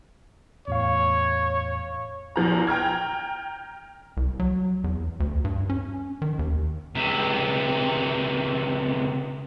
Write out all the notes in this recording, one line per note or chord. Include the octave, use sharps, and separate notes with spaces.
E2 A2 C#5 F5
A#1 E2 F3 A#5
G5 A#5 F6 G#6
C2
F#3
E2
D2
G2
C#4
D#3
D#2
C#2 C3